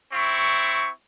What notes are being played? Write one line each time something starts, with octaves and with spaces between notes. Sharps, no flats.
C4 E4 C#6